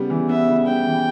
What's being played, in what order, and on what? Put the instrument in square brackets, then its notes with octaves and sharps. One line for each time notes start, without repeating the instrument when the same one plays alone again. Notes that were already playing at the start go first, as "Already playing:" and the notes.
Already playing: [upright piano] C#3 G3 B3
E3
[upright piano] B3 [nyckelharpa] E5
[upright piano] C#3
[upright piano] G3 [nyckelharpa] G5
[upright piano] E3